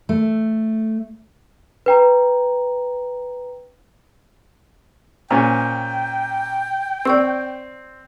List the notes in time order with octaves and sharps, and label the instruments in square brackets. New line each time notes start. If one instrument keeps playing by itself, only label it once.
[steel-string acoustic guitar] A3
[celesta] B4 G5 A#5
[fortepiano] A#2 C#4 [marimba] C5 [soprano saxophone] G5
[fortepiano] C4 [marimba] D5 C#6 E6